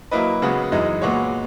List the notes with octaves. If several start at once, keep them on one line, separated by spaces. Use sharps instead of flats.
F#3 A#3 E4 B4 D#5
C#3 G#3 B3 F#4
F#2 E3 G#3 D#4
A#2 G#3 B3 F#4 C#5